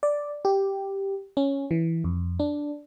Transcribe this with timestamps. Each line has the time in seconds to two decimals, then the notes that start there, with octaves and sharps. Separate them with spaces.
0.03 D5
0.45 G4
1.37 C#4
1.71 E3
2.04 F2
2.40 D4